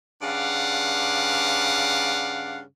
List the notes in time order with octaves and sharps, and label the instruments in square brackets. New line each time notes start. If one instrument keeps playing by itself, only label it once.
[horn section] G2 C#3 D5 F5 F#5